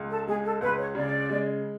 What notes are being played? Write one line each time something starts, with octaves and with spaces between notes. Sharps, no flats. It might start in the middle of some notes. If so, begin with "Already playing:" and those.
Already playing: C#2
A4
G#3 G#4
A4
C#2 B4
C#5
C#3 D5
G#3